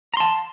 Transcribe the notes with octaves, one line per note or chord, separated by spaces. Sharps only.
A5 A#5 C6